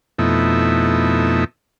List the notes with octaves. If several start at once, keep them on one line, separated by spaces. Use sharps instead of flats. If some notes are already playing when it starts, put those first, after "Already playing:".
F2 B2 A3 D#4 E4